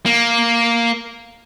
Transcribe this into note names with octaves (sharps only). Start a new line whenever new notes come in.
A#3